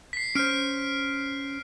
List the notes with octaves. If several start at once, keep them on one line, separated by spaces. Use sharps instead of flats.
B6 C7
C#4 C5 F6 D7